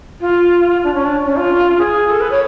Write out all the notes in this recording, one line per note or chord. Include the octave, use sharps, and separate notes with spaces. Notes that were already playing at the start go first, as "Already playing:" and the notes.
F4
D4
C#4
D4
C#4
F4
G#4
A4
B4
C#5